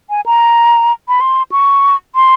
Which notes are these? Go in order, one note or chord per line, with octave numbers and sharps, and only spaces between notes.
G#5
A#5
B5
C6
C#6
C6